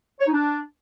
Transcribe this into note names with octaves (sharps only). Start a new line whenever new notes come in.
C#5
D#4
D4